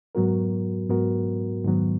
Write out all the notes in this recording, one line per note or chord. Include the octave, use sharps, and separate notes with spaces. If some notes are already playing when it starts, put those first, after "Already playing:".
G#2 F#3 B3 F#4 A#4
G#2 F#3 B3 F#4 A#4
G#2 D#3 F#3 B3